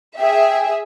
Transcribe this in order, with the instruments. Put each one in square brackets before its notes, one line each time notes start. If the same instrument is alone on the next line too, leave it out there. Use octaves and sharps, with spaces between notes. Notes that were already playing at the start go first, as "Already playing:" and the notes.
[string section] G#4 E5 [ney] G5